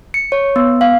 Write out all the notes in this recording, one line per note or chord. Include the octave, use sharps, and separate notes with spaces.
C#7
C#5
B3
F5